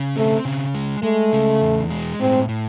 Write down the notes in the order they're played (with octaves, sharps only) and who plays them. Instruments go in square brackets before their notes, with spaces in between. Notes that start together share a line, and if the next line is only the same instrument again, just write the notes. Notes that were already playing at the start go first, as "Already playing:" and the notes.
Already playing: [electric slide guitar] C#3
[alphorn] A3 [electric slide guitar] C4
[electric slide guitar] C#3
G#3
[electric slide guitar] G#3 [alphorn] A3
[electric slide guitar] C#3
E2
G#3
[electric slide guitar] A2 [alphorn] C4
[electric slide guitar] A2